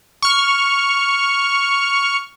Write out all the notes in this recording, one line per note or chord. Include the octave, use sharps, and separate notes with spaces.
C#6 F6